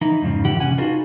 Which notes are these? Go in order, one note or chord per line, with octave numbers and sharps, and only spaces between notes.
E3 D#4 E4
F2 G#2 C#3 F3
D3 E3 G4 F#5
C3 C#4 F#5 G#5
D4 D#4 F4 F#4 G#4 B4